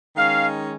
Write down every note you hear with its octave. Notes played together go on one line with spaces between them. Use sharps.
D#3 G#3 C#4 F5